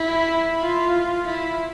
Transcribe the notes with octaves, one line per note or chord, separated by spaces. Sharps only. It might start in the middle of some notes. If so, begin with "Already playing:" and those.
Already playing: E4
F4
E4